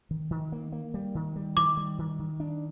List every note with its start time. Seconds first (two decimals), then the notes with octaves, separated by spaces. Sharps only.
0.11 D#3
0.31 D#3
0.52 A#3
0.72 A#3
0.94 G3
1.15 D#3
1.36 G3
1.57 D#3 D6
1.77 G3
1.99 D#3
2.19 D#3
2.40 D4